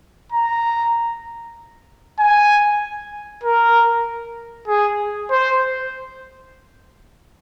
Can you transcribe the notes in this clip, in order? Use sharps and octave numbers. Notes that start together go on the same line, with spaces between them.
A#5
G#5
A#4
G#4
C5